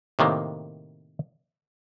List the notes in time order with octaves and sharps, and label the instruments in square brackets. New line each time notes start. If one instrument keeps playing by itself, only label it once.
[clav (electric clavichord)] A2 C3 D#3 A#3